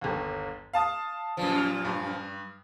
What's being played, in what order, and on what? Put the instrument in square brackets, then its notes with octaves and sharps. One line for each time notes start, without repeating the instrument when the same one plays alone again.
[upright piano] G1 D#2
F5 A5 D#6
[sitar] F#2 A#2 F3
[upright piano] F6 F7
G2